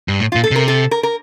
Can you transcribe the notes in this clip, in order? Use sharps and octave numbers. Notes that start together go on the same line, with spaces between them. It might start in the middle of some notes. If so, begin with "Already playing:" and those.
G2
A2
F4
A#2
A4
C3 A#4
A4
A#4
A#4